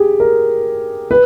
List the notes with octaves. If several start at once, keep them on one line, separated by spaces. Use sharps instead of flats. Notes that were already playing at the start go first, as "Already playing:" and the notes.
Already playing: G4 G#4
A#4
B4